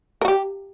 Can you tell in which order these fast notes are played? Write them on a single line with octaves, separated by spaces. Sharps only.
A#4 F#4 G4